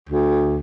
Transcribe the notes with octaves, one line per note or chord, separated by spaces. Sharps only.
D2